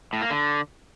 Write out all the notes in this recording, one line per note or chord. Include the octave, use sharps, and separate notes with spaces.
A2
A#3
D3